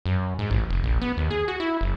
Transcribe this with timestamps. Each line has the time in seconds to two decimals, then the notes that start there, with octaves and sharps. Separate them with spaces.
0.06 F#2
0.39 G#2
0.51 A1
0.70 F1
0.84 A#1
1.01 B3
1.17 D#2
1.30 G#4
1.48 F#4
1.60 E4
1.81 F#1